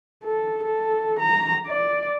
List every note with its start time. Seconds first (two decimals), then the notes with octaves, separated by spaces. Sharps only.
0.24 A4
0.63 A4
1.19 A#5
1.66 D5